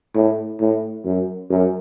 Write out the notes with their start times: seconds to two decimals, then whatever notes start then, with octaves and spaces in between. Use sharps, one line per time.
0.15 A2
0.60 A2
1.05 F#2
1.50 F#2